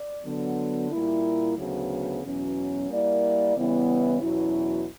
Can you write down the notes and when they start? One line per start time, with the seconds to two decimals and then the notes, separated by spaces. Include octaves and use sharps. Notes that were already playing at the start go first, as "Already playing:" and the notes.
Already playing: D5
0.24 D3 F#3 B3
0.91 A#2 G3 A#3 E4
1.57 D2 C#3 F#3 B3
2.23 E2 B2 F#3 C#4
2.89 G3 A#3 E4 A#4 D5
3.55 C#3 E3 G3 B3 E4
4.20 E2 B2 F#3 C#4 E4